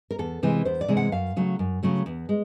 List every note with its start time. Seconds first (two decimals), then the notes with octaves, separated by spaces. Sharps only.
0.11 A#4
0.19 E2 A4
0.43 C3 E3 G#3
0.65 E2 C5
0.81 D5
0.88 C3 E3 G#3
0.97 F#5
1.12 F#2 F5
1.36 C#3 F#3 A3
1.59 F#2
1.83 C#3 F#3 A3
2.06 E2
2.29 G#3